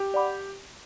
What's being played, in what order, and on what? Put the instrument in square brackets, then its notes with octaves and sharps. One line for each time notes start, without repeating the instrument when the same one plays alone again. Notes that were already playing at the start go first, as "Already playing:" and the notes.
Already playing: [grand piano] G4
[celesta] D5 F#5 B5 D6